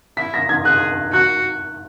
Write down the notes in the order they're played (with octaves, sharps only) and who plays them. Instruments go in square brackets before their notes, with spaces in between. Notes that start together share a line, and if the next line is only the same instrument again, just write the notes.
[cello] E4 [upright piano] B6
[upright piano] A#6
G#6
[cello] G#4 [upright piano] F#6
[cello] F#4 [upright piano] F#6